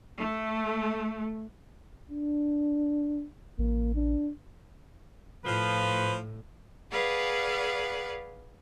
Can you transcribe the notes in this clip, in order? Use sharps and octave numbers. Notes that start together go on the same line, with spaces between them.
A3
D4
A1 A#3
D4
A2 F3 B4
G#4 B4 D5 F5 F#5 G#5